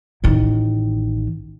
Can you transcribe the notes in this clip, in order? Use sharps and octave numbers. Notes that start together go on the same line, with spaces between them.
A1 D#3